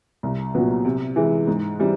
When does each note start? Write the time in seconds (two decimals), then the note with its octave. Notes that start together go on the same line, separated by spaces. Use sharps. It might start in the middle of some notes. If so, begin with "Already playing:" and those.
0.23 C2
0.54 A#2 F#3 B3
0.85 C3
1.16 E3 G#3
1.47 G#2
1.79 E3 G3 C4